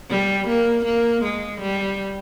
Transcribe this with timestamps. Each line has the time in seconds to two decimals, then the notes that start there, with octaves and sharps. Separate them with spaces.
0.10 G3
0.48 A#3
0.85 A#3
1.24 G#3
1.61 G3